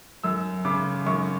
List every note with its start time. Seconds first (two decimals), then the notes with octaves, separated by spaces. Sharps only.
0.23 F#2 E6
0.65 C#3 D6
1.06 F#2 C#6